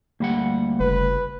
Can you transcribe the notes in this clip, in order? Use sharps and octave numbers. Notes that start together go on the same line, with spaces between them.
D2 G3 A#3 F#5
F#1 B4